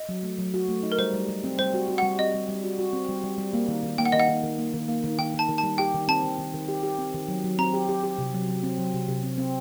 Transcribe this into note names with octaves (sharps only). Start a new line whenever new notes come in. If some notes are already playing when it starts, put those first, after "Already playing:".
Already playing: D#5
F#3
A3
F#3
F#4
A3
D#4
A#4
G3 C5
G3
G3
C4
G3 C5
F#4
F#4
G3 F#5
C4 D#5
G3
G3
F#4
F#4
C4
G3
G3
G3
A#3
D#3
D#3
A#3 G5
F#5
D#3 D#5
F#5
D#3
D#3
A#3
D#3
A#3
D#3
D#3 G5
D#3
A5
D#3
A5
G3
G4 G5
D#3
C4 A5
D#3
D#3
D#3
G4
G4
C4
D#3
F#3
F#3
C4 A#5
G4
G4
G4
C3
F#3
F#3
C4
F#3
C3
C3
C4
C4